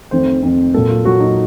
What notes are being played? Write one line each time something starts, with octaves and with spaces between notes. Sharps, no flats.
F2 D#3 A3 C4 C5
F2 D#3 A3 C4
A#2 F#3 A#3 A4
F4
A#2 F#3 A#3 F#4
D#4